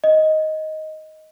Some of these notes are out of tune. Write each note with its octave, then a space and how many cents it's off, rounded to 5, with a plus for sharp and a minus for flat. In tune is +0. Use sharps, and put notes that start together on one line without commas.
D#5 +10